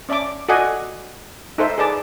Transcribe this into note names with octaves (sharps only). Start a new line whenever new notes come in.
C#4 D5 E5 A5 D6
F#4 A4 D5 D#5 F#5 G#5
D#4 A4 C5 E5
G#4 B4 D5 A5 D6